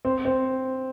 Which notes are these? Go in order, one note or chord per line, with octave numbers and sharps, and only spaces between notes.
C4
C4